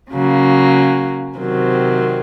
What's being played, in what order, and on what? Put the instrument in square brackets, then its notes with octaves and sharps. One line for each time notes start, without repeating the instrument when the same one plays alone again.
[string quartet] C#3 F#3 A#3
C3 D#3 F#3 C4